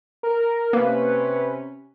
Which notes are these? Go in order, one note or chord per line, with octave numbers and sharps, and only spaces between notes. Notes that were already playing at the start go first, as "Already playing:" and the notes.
A#4
C3 A#3 C#4 B4